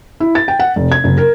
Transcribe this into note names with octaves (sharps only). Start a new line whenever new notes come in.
E4
A6
G5
F#5
F1
G#6
F#1
A#4